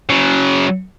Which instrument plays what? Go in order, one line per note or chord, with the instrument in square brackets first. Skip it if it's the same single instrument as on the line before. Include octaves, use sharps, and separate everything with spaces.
[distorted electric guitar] C#3 F#3